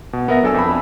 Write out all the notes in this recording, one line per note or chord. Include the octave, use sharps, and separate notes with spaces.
B2
B3 A#4 E5 A#6
F#3 D4 A4 G#5 E6
F2 B5